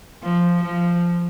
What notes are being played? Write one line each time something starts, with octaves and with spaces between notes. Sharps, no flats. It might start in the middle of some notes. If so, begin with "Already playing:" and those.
F3
F3